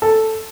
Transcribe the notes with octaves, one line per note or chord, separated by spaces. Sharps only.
A4